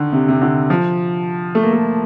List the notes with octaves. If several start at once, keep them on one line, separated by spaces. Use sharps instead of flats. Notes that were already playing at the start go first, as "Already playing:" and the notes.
Already playing: D3 D#3
C3
C3
D3
F3
A3
A#3
A3